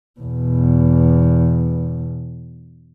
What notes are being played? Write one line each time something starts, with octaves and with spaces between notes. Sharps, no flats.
E2 B2